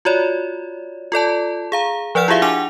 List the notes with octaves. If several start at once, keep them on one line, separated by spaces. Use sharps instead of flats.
F4 F#4 C#5 D5
F4 A4 D5 A5
G#4 F5 A#5
F3 B4 D5 F#5 F6 E7
E4 F4 G4 G#4 E5 F5
D4 F#5 G#5 D6 F7